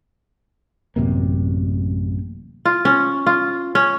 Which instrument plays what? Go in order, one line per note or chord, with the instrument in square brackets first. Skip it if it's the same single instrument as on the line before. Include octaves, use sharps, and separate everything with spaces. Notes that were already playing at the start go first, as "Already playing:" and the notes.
[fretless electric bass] A1 F#2 C3 A#3
[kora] F4
C#4
F4
C#4